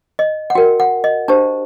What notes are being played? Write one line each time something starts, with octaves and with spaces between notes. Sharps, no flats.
D#5
F#5
F#4 A#4 G5
F#5
D#5
D4 G4 C5 A5